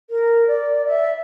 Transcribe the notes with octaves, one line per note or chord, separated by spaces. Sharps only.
A#4
D5
E5